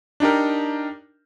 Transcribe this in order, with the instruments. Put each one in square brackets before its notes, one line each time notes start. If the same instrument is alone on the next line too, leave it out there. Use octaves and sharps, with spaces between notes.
[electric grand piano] D4 D#4 G4 A#4